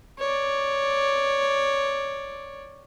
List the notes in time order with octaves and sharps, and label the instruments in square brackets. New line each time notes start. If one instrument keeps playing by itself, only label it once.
[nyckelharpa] C#5 D5